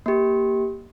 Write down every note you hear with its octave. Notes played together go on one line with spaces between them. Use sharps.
A#3 G4